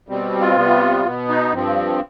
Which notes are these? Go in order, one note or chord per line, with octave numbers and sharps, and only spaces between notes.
B2 G3 C4
F4
C3 G3 B3
B2 B3
D#4
G2 F3 C4